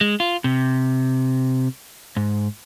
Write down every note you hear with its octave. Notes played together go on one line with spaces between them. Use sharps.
G#3
F4
C3
G#2